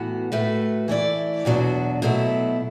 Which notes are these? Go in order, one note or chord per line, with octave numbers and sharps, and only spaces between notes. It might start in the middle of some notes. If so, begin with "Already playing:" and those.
Already playing: A2 E3 B3 F#4
A2 A3 F#4 B4
E3 A3 E4 D5
E2 B2 F#3 D4 F#4
B2 F#3 A3 E4